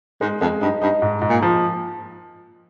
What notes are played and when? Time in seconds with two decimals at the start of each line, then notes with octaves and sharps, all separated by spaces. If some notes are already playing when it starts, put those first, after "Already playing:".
0.21 G#2 G#3
0.41 F2 G#3
0.61 G2 D#4
0.82 G2 D#4
1.02 G#2
1.22 G#2
1.29 A#2
1.42 F3